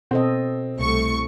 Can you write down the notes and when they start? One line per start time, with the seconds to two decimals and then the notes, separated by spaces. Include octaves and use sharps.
0.11 B2 C4 A4 D#5
0.77 C2 A3 C#6